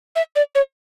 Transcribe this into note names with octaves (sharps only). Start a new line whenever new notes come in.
E5
D5
C#5